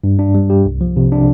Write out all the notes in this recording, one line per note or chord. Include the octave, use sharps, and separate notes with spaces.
G2
D4
G3
G4
C2
F3
C3
D4